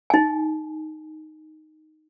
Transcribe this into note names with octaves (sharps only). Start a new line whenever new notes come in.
D#4 G#5